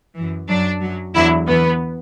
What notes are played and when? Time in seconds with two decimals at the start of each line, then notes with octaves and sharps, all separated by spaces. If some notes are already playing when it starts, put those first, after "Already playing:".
0.16 F#2 E3
0.48 F#2 F#3 D4
0.81 F#2 F#3
1.15 E2 D3 F#3 E4
1.47 E2 E3 B3